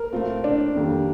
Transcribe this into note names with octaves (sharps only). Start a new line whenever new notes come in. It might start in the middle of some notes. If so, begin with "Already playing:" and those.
Already playing: A#4
A2 A3 C4 F4
D4
F2 D#3 G3 A#3